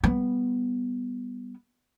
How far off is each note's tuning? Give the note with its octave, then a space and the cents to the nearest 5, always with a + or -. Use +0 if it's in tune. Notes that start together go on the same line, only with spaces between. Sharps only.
G3 +0 B3 +0